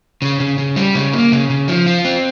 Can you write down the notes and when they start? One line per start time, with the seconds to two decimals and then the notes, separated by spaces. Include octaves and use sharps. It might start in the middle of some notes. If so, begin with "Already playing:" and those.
0.22 C#3
0.40 C#3
0.58 C#3
0.76 G3
0.95 C#3
1.13 A#3
1.32 C#3
1.50 C#3
1.68 F3
1.86 F4
2.05 C4